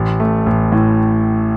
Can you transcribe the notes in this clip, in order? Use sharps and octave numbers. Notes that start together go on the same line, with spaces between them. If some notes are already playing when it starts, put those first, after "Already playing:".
Already playing: A1
A3
A1
A2